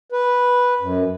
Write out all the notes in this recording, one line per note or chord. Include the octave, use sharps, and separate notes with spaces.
B4
F#2